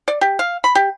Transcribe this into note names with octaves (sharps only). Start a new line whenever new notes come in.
D5
G4
F5
B5
G4